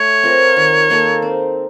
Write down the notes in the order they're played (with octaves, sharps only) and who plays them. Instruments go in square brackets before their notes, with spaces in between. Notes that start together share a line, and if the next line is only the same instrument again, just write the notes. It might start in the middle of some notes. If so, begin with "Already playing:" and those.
Already playing: [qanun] A3 [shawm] C#5
[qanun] C4 F4 A#4
D#3
A#3 D#4 A4
C4